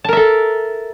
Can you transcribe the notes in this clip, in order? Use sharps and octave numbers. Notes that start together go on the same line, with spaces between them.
A4 A#4 E5 A5